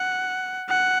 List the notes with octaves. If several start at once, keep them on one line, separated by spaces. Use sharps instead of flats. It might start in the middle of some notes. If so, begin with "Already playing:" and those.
Already playing: F#5
F#5